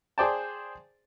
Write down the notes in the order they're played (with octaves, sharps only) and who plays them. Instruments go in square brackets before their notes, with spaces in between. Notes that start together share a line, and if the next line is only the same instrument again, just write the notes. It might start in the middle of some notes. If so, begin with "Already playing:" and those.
[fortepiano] G#4 C5 D5 G5 A5